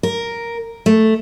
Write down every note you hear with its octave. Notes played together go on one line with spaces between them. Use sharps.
A#4
A3